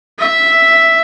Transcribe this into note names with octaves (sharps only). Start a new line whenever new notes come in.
E5